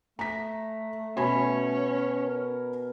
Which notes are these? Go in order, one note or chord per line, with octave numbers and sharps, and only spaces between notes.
A3 A#5 B6
B2 C#4 G#5 B5
A#4